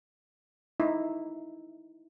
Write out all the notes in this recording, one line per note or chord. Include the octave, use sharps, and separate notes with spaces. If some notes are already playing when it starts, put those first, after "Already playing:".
D#4 E4